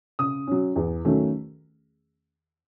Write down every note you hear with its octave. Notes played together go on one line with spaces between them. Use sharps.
C#3 D#6
F#3 C#4
E2
D#3 F#3 A3 C#4